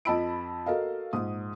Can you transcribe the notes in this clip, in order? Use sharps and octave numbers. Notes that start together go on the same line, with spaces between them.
F2 D#5 A5 B5 E6 D7
F#4 A4 A#4 D#5 F5
A#1 G#2 D#6